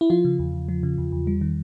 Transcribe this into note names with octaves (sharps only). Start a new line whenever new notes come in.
E4
F3 F4
C#3
E2
E2
F3
C#3
E2
E2
G3
D#3